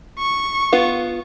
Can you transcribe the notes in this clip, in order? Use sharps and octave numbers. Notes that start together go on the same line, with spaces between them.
C#6
B3 F4